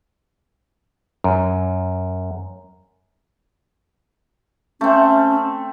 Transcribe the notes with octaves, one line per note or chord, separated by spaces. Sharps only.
F#2
A3 C4 C#4